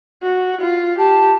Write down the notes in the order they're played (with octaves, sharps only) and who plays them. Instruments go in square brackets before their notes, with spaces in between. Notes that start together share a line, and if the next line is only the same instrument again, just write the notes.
[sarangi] F#4
F4
[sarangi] G4 [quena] A5